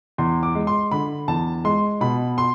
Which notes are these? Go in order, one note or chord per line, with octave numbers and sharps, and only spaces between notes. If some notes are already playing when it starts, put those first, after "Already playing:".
E2 C6
D6
G#3
C6
D3 B5
E2 A5
G#3 C6
B2 B5
C6